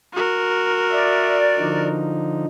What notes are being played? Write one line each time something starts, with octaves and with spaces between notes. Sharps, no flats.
F#4 A#4
D5 E5
D3 F3 D#4